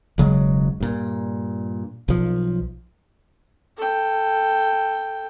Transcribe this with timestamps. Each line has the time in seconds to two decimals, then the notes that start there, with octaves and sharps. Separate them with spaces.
0.18 E1 C#3 F#3 G#3
0.80 G2 A#2
2.08 B1 F3
3.77 A4 G5